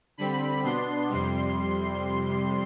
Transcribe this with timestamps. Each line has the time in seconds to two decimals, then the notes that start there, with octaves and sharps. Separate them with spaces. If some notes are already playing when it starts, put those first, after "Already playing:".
0.17 D3 G3 C4 B5
0.64 B2 B3 D4 C6
1.09 F2 C3 G3